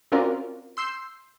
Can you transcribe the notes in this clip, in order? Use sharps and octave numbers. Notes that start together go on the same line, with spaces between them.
C4 C#4 F4 F#4 A#4 D5
C6 E6 G6 C7